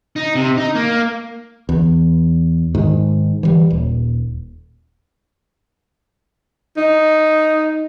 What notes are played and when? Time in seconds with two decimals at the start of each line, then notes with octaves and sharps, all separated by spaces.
0.16 D#4
0.35 C3
0.57 D#4
0.75 A#3
1.69 E2
2.75 G#2 D#3
3.43 E3 G3
3.71 D#1
6.77 D#4